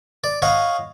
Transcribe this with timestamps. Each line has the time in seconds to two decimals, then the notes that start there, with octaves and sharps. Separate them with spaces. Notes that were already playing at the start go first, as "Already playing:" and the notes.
0.24 D5
0.42 C#5 D#5 F5 F#5